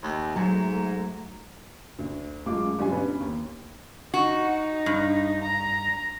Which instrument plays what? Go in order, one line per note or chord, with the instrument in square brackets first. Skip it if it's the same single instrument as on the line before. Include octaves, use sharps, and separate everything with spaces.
[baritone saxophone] D#2 [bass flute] A3
[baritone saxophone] G#2 [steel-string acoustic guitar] F#3
[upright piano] D2
F#2 G#3 A3 F4 D6
G1 F#3 G3 F4 G#5
D3 B3 C#4 B4
D#2
[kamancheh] D#4 [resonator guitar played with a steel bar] F#4
[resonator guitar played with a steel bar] G2
[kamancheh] A#5